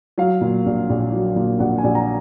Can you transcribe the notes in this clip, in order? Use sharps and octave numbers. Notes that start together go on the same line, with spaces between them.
F#3 F5
A#2
A#1
A#1
F#3
A#2
A#1 F#5
G#5
A#1
A#5